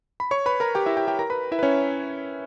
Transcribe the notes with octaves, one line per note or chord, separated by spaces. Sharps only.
B5
C#5 C#6
B4 B5
A#4 A#5
G4 G5
E4 E5
G4 G5
G4 G5
A#4 A#5
B4 B5
E4 E5
B4
C#4 C#5